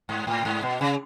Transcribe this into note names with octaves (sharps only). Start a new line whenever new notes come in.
G#2
A2
G#2
B2
C#3